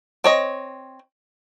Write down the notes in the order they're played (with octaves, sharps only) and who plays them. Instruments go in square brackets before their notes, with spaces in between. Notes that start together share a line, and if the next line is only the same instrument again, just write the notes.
[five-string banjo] C4 C#5 D#5